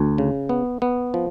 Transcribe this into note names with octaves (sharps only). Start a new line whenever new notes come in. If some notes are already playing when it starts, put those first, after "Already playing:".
Already playing: D2
C#3
B3
B3
F3